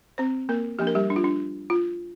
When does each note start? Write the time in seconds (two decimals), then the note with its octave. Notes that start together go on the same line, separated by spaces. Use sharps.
0.18 C4 C5
0.49 A#3 A#4
0.79 F3 A#3 D4 G4
0.87 A#4
0.95 G3 G4
1.10 D4
1.16 F4
1.24 D4
1.70 F4